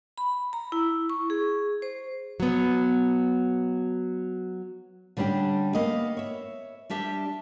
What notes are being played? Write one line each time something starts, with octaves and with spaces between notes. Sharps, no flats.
B5
A#5
E4
C#6
G#4
C5
F#3 B3
D3 G3 C#4 D4 G4
A#3 B3 D#5
C#5 E5
G3 D4 G4 E5 A5